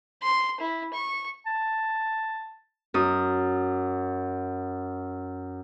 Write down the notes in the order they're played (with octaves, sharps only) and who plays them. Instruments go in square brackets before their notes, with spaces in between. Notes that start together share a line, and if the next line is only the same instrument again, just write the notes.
[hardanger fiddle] C6
E4
C#6
[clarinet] A5
[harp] F#2 D#6